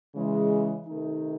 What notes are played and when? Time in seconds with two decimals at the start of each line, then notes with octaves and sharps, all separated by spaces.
0.14 C#3 E3 G#3
0.87 C3 D#3 A3 D#4